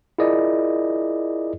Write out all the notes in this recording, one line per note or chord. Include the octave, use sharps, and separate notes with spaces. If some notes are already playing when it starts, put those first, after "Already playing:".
E4 F4 G#4 A#4 D5 D#5